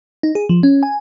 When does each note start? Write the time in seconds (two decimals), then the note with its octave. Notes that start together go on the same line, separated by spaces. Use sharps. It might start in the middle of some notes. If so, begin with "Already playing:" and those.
0.23 D#4
0.35 G#4
0.49 F3
0.63 C#4
0.83 G#5